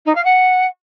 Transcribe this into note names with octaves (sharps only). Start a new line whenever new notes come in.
D#4
F5
F#5